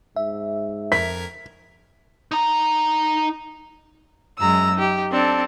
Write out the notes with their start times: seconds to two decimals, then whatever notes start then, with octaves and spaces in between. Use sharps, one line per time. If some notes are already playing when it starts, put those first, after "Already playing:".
0.16 G#2 E5
0.92 F2 A#4 G#6 B6
2.31 D#4 A#5
4.40 F#2 G#3 A#5 E6
4.74 D#4 G4
5.11 C4 D4 A4